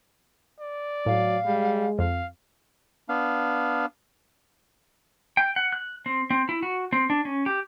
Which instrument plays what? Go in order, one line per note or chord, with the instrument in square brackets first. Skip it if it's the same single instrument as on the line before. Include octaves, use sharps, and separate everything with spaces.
[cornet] D5
[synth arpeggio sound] A2 [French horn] F#3 [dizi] F5
[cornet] G3 [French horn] G#3
[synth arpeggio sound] F2 [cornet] F5
[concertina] B3 D4 F5
[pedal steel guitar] G5
F#5
F#6
C4
C4
E4
F#4
C4
D4
C#4
G4